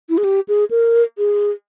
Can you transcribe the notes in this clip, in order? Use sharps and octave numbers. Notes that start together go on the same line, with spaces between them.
E4
G#4
G4
G#4
A#4
G#4